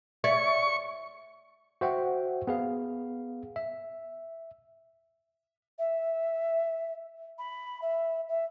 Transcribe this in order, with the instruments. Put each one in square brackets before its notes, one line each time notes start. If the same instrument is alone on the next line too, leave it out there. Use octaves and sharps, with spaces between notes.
[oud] C#5 D5 E5 [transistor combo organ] C#6
[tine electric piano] F#4 C5 E5 F#5 G5
B3 G#4 F5
E5
[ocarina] E5
B5
E5
E5